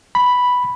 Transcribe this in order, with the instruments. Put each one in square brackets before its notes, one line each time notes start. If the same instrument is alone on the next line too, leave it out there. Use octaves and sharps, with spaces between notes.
[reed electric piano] B5